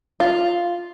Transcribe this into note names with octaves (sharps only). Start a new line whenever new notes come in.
F4